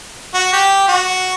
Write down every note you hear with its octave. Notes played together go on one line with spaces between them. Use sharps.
F#4
G4
F#4